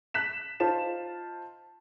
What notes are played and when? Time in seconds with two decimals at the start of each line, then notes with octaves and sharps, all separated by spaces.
0.14 F#6 B6 E7
0.60 D#4 F4 C5 A5 E7